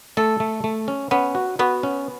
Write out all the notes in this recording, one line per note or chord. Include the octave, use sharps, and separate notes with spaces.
A3 A4
A3
A3
C#4
B3 C#4
F#4
B3 F#4
C#4